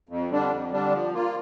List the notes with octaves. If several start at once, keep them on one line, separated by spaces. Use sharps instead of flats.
F2
D3 G3 D4
F2
D3 G3 D4
F3
A#3 F4